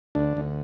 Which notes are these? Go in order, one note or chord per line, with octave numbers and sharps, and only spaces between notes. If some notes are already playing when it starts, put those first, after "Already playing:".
D2 D4
D2